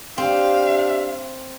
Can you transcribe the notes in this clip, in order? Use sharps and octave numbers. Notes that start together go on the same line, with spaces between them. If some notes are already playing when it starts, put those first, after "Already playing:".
C4 D4 G4 F5